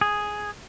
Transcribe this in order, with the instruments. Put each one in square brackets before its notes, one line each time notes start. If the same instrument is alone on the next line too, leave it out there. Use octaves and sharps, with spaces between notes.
[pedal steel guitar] G#4